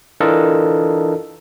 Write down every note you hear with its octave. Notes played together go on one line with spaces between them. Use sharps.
E3 D4 F4 A4 A#4 D#5